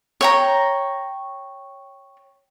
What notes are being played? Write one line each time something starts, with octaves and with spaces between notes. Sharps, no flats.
C#5 G5 A#5